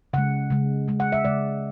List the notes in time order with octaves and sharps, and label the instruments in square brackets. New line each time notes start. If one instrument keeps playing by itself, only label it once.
[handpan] C#3 G#3 F#5
C#3 G#3
C#3 G#3
F#5
E5
C#3 G#3 D5